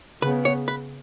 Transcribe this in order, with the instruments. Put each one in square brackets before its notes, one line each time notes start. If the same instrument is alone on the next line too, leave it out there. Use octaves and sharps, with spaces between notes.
[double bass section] C#3 B3 [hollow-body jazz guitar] B4
[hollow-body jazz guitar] C#5
B4